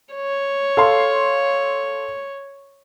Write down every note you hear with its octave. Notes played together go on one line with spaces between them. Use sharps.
C#5
A4 F5 C6